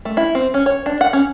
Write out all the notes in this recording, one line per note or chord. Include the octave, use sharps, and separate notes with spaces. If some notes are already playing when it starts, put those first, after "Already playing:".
A3
E4
C4
C#4
C#5
D4
F#5
C#4